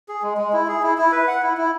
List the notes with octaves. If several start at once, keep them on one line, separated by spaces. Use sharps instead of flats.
G#4
G#3
G#3
E4
G#4
E4
E4
B4
F#5
E4
E4